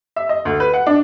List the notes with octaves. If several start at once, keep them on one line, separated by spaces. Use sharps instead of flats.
E5
D#5
D2
B4
F#5
D4